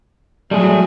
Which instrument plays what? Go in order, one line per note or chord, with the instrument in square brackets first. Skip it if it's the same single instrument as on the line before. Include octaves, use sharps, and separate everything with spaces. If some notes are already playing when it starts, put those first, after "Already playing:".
[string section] A2 F#3 [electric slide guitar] G3 A3 G#4